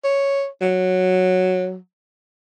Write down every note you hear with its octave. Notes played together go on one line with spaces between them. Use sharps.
C#5
F#3